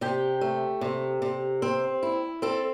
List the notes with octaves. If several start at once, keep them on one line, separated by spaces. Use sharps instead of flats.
C3 G4 G5
A3
C3
C3
C4
E4
C4 A4